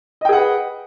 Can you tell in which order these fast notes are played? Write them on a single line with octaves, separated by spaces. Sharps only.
D#5 G5 G#4 F#5 B4